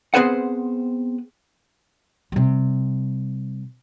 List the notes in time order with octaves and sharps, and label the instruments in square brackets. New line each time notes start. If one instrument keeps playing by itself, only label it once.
[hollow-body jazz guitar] B3 C4 G#4 B4 C5 F#5
[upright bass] C3 G3